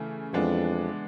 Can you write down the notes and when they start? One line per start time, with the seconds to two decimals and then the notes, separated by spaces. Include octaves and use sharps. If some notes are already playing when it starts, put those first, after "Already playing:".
Already playing: C#3 E3 A3
0.33 F2 E3 G#3 B3 D4